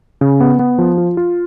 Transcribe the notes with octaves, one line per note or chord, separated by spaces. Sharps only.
C#3
B3
B3
F3
F4
F4